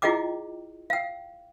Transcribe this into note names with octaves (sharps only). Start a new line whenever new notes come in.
E4 F4 G#4 D#5 G5 D6
F5 G5